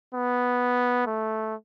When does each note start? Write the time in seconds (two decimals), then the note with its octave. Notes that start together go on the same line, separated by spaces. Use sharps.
0.14 B3
1.07 A3